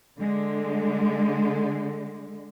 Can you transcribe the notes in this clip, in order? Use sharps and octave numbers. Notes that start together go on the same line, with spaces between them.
D3 G#3